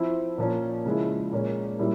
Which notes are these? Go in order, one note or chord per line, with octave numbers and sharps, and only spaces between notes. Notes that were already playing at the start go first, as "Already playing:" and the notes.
Already playing: F3 C4 E4
A#2 F3 A#3 C#4
C#3 F3 G#3 E4
A#2 G#3 C#4
A#2 G3 C#4 E4